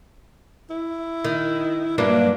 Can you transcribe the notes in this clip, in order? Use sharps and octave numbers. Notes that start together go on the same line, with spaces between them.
E4
D#3
G2 F#3 A#3 D4